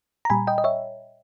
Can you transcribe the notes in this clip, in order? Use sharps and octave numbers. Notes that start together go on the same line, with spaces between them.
A#5
A#2 G3 G#5 B5
D#5 G5
D#5
C#5 E5